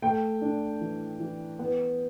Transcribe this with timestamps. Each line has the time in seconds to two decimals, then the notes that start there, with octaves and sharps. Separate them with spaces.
0.02 A3 G5
0.42 D4
0.81 E3
1.20 E3
1.59 B3